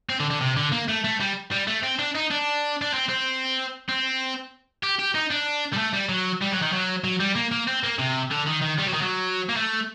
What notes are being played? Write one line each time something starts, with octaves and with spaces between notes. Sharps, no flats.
C4
D3
D3
C3
D3
A#3
A3
A3
G3
G3
A3
C4
D4
D#4
D4
D4
C4
C4
C4
G4
G4
D#4
D4
G3
A3
G3
F#3
G3
F#3
D#3
F#3
F#3
G3
A#3
A#3
C4
A#3
C3
D3
D#3
D#3
G3
F#3
D#3
F#3
A#3
A3